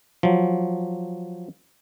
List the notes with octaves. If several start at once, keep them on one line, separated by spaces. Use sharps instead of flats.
F3 F#3